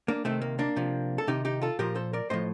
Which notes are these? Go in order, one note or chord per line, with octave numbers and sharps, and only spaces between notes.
A#3 D4
C3 D#3 A3 C4
A#3
A#3 D4
C3 F3
A4
C3 D#3 D#4 G4
D#4 G4
F4 A4
A#2 F3 G4 A#4
A4 C5
A#4 D5
A2 F3 C5 D#5